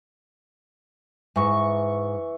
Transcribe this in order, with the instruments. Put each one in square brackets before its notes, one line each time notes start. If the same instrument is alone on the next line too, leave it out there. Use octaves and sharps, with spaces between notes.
[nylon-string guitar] G#2 [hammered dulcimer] E3 C#6